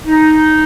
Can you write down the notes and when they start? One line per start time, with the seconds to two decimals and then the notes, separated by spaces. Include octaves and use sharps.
0.06 D#4